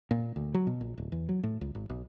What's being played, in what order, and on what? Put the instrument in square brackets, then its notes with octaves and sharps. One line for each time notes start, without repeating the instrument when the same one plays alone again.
[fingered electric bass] A#2
D2
F#3
B2
A#1
D1
E2
F#3
A2
C#2
G#1
B1